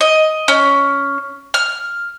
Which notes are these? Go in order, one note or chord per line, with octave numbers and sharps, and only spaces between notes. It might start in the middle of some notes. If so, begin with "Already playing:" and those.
D#5
C#4
F6